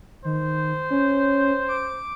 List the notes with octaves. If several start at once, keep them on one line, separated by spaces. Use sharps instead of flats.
D#3 C5
C#4
D6